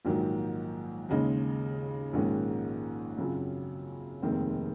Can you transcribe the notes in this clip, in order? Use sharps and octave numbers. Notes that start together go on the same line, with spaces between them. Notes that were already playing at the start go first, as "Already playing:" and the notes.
A#1 G#2 D#3 F#3
D#2 C#3 G#3 D#4
A#1 G#2 D#3 G#3 C#4
F#2 C#3 F#3 C4 F4
F1 D#2 D#3 G#3 C4